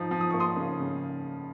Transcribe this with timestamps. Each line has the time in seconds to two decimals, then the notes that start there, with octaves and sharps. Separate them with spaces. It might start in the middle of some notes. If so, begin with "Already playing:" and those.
Already playing: F3 D#4
0.11 F3
0.21 D#6
0.30 A#3 C#6
0.40 C6 D#6
0.56 C#3
0.79 C#3